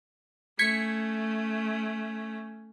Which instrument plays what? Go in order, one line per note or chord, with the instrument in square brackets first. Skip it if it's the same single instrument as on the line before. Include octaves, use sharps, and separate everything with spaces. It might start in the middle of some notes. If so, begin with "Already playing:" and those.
[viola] A3 C#4 [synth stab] G#6 B6 C#7